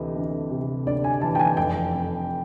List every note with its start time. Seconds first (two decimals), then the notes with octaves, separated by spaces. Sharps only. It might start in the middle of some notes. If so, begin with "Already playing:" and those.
Already playing: D2 C3 E3 D#5
0.16 D2
0.51 C3
0.87 D2 D5
1.04 G#5
1.21 E3 A5
1.35 G5
1.39 G#5
1.57 F1 G5
1.93 F2